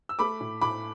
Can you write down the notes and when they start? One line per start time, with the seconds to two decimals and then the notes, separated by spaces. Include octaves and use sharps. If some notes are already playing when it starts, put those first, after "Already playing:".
0.09 E6
0.19 A3 B5 D6
0.41 A2
0.61 A2 B5 D6